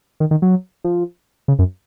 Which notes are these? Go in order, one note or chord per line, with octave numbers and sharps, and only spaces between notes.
D#3
D#3
F#3
F3
C#3
F#2